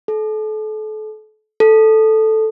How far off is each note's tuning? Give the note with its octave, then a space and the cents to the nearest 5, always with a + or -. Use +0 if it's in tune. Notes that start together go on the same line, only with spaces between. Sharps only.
A4 -35
A4 -5